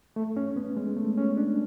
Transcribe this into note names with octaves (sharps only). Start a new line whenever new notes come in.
A3
C#4
B3
G#3
A3
C#4
D4